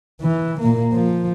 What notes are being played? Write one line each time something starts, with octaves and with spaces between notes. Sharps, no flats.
E3
A#2 A#3
F3